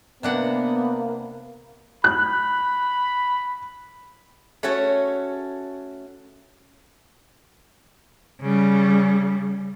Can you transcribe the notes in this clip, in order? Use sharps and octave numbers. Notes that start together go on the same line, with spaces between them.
C3 A#3 B3 D4 F#5
B5 F#6
A3 C#4 F#4 A4 C#5
C#3 G3